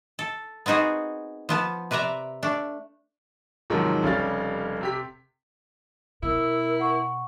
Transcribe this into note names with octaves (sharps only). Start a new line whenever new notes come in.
A4
B3 C4 D#4 F#4 G#4
F3 B3 A5
C3 B4 D5 E5 A#5
A3 D4
G#2 C3 D#3 F3 F#3
F1 C#3 G3 F5 A6
C3 G4 B6
B2 E4 A#4 E6
F#5 C#6